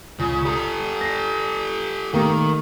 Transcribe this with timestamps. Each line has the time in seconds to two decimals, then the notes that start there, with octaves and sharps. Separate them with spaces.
0.19 C#2 C#3
0.45 G4 A4 D#6
1.01 A#6 C7
2.13 D#3 A3 A#3 G4